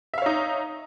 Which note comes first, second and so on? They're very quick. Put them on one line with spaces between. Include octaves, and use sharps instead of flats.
E5 F5 C#5 D#4